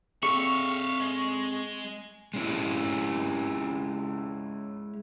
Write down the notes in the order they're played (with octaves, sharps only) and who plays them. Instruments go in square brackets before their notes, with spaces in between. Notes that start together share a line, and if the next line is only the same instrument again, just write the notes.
[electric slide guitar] C4 G#4 A4 [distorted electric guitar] E5 F5 [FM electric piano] C#6
[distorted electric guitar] G#3
[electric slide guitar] G#3 C#4 E4